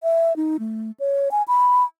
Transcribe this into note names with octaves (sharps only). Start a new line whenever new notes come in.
E5
D#4
A3
C#5
G#5
B5